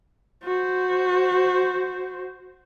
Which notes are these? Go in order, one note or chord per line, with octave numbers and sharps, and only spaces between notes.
F#4 C5